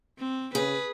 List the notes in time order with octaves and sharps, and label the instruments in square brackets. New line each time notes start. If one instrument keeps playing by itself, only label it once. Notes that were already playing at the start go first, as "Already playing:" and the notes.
[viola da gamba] C4
[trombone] C#3 [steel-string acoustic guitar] G#4 [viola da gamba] B4